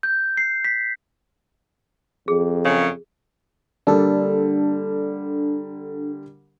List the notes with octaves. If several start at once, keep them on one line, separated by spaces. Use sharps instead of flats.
G6
C7
B6
F2 G#4
F#2 C#3 C#5
D3 G3 A#3 D4 A4